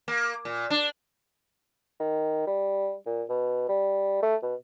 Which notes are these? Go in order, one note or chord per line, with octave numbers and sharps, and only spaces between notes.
A#3
A#2
D4
D#3
G3
A#2
B2
G3
A3
B2